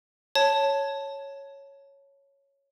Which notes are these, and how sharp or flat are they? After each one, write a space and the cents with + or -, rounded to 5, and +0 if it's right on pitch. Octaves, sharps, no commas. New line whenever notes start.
C#5 +0 A5 +0